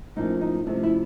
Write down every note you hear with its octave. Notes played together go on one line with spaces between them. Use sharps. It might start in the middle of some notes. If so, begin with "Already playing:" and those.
A2 F3 A#3 C#4 D#4
D#4
C3 F3 A3 C#4 D4
E4